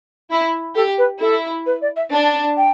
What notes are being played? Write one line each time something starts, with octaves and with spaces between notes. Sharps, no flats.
E4
G4 A4
B4
E4 A4
B4
D5
E5
D4 A5
G5